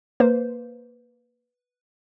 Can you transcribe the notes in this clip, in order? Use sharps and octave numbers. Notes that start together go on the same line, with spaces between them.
A#3 B4 C5